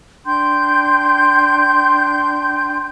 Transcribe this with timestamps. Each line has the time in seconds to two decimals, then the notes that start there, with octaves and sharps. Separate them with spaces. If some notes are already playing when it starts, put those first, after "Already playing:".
0.25 D4 G5 C6 G6